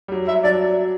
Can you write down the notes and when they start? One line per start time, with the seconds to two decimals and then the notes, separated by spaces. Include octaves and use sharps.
0.08 G3
0.12 F#3
0.28 E5
0.44 F#3 D5